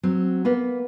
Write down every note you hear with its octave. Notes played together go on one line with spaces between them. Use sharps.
F#3 C4
A#3 B3 B4